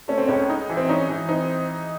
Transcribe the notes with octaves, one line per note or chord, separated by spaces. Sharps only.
A3 C#4
C4
C#2 C#4
D#4
E3
C4
C#4 D#4
E3
C4 D#4